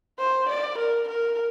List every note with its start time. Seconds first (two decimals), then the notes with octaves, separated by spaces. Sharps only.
0.19 C5
0.49 D5
0.78 A#4
1.09 A#4